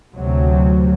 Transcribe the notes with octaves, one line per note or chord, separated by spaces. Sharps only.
D2 C3 F#3